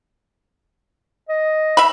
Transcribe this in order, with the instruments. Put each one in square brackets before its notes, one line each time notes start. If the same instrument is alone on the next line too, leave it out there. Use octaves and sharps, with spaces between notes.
[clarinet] D#5
[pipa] E5 B5